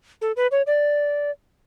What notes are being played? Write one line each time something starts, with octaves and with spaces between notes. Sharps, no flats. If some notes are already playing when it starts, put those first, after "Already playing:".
A4
B4
C#5
D5